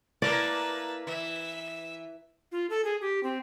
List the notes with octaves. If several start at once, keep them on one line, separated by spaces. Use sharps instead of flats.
A#3 E4 A#4 B4 D5 A5
E3 E5
F4
A4
G#4
G4
C4